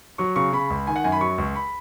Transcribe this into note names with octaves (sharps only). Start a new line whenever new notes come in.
F#3 C#6
C#3 C#6
C#3 B5
C#2
D#3 G#5
F#5
F#2 G#5
B5
F#3 C#6
C#2
B5